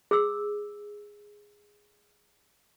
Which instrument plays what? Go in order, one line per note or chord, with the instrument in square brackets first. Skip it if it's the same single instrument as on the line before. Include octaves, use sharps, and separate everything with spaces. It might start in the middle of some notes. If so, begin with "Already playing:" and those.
[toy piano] G#4 E6